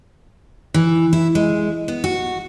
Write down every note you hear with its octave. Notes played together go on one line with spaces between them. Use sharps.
E3
E4
G#3
B3
F#4